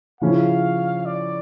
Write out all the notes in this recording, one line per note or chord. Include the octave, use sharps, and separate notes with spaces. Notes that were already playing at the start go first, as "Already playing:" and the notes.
C#3 F3 C#4 E4 F5
D5